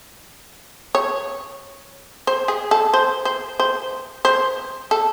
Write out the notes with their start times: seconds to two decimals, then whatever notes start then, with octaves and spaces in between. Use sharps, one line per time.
0.95 C#5
2.27 C5
2.48 G#4
2.71 A4
2.94 C5
3.25 C5
3.60 C5
4.25 C5
4.91 A4